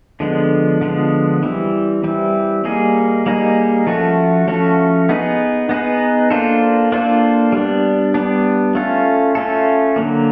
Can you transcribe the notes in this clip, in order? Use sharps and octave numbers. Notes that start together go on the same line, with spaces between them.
D3 F3 G#3 B3
D3 F3 G#3 B3
E3 G3 C4
E3 G3 C4
G3 A#3 D#4 G#4
G3 A#3 D#4 G#4
F3 A3 C#4 F#4 A4
F3 A3 C#4 F#4 A4
B3 D#4 G#4 B4
B3 D#4 G#4 B4
A#3 D4 F4 A4 C5
A#3 D4 F4 A4 C5
G3 B3 D4
G3 B3 D4
A3 C#4 F4 A4
A3 C#4 F4 A4
D3 F#3 A#3